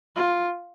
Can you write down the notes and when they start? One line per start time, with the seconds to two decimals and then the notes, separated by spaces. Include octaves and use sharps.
0.16 F4